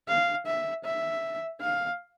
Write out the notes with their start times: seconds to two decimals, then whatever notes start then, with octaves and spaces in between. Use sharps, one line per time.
0.08 F5
0.47 E5
0.85 E5
1.61 F5